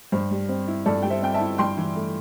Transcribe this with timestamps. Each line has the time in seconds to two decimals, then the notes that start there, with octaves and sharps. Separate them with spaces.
0.12 G2 C5
0.31 G3
0.49 C4
0.68 E4
0.86 G2 A4 D5
1.03 G3 G5
1.10 C5 E5
1.23 C4 G5
1.34 E5 A5
1.40 E4
1.58 G2 G5 C6
1.77 E3
1.96 A3